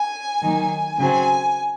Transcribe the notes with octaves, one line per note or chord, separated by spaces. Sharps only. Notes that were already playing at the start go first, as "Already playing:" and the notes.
Already playing: G#5
D#3 F#3 A#3 D#4
C#3 F#3 C4 G#5